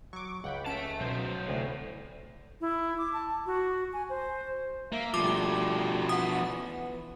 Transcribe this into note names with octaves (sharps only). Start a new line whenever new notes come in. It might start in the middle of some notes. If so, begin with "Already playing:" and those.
F#3 C#6 D6
C#2 F#5 G5 B5
C#4 E5 A5 D7
B2 F#3 C5
D2 A2 C3
E4
D6
A5
F#4
G#5
C5
A#3 E5 F5
B2 F3 G3 A3 D6
E3 B3 F#5 D#6